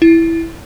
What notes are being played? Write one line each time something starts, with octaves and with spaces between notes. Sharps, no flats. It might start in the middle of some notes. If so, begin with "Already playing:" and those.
E4